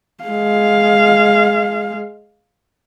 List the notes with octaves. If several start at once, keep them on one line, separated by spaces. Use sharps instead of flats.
G#3 F5